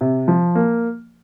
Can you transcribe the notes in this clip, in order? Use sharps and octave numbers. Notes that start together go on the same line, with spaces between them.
C3
F3
A#3